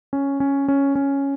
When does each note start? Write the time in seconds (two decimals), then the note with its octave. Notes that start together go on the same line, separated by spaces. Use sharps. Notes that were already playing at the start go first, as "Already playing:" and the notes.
0.13 C#4
0.40 C#4
0.68 C#4
0.95 C#4